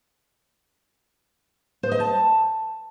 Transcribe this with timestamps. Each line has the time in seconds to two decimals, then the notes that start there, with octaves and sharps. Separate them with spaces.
1.83 C5
1.92 D#5
2.00 A5